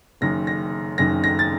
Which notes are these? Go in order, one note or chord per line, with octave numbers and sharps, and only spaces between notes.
F#1 F#2 D#3 A#6
A#6
F#1 F#2 D#3 A#6
A#6
A6